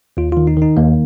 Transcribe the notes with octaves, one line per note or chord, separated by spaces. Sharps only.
D#2 F4
D#3 F4
D#4
D#3
D#4
D#2 A#3